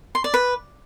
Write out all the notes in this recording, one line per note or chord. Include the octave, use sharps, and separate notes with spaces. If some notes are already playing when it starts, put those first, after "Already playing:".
C6
D5
B4